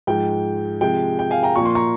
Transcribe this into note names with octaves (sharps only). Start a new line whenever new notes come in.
G#2 F3 G#3 G5
C3 F3 G#3 G5
G5
F5 G#5
G5 A#5
A#2 F3 A#3 C#6
C6
A#5 C#6